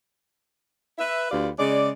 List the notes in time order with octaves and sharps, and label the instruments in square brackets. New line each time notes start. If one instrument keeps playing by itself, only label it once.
[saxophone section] B4 E5
D2 F4 G4 B4 D5
C#3 G#3 D5